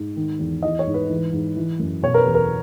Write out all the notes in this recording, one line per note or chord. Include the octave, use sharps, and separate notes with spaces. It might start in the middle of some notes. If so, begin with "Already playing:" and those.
Already playing: G#2
D#3
E2
E3 D#5
C#5
G#2
B4
E3
G#2
E3
F#2
B2 C#5
A#4
B4
E2
A#4